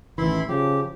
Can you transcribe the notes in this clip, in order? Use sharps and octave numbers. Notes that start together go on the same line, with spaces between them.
A1 D#3 E3 E4 B5 C6
C#3 F3 G4